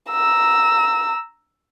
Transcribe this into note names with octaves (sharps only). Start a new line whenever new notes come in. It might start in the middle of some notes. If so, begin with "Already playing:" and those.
A#5 E6